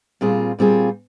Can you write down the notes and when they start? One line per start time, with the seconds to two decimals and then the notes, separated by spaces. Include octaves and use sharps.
0.21 A#2 G3 C4 F4 G#4
0.59 A#2 G3 C4 F4 G#4